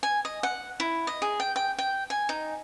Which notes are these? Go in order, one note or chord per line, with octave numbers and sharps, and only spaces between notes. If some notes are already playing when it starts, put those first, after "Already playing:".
G#5
D#5
F#5
E4
D#5
G#4
G5
G5
G5
G#5
D#4